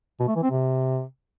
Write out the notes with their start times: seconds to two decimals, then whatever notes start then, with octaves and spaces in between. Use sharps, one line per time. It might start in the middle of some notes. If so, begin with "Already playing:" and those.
0.20 B2
0.28 A3
0.36 E3
0.43 C4
0.51 C3